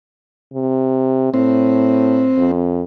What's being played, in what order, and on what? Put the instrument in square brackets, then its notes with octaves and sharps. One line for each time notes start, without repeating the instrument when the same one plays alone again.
[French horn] C3
[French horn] A2 [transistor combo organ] C4
[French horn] F2